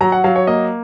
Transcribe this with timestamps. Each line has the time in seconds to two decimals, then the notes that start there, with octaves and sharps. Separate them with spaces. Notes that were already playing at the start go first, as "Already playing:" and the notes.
0.01 F#3 A#5
0.12 F#5
0.24 F#3 F5
0.36 C#5
0.47 A#3 D#5